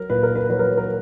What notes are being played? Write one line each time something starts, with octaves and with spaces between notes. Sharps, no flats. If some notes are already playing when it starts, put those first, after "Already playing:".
Already playing: F#3 A#4
A#2 B4
A#4
B4
F#3 B4
A#4
A#4